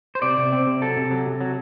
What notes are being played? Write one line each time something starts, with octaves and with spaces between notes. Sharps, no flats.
C5
C3 D5
C3
C4
C3
F#3 A4
C3
F#3
C3
F#3